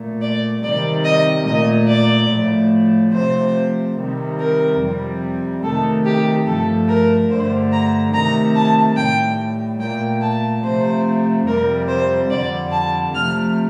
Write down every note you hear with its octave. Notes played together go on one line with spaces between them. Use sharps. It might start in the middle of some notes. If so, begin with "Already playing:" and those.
Already playing: A#2 A3
D5
C3 D#3 G3 D5
D#5
A#2 A3 D#5
D5
A2 F3 A3
C3 F3 A3 C5
C3 D#3 G3
A#4
F2 C3 G3
C3 D#3 A3 A4
G4
G2 F3 A3 A4
A#4
G2 D3 A3 C5
A#5
C3 D#3 A3 A#5
A5
A2 G3 G5
A#2 A3 G5
A5
C3 F3 A3 C5
F2 C3 G3 A#4
C5
F2 D3 G3 D5
A5
C3 F3 A3 F6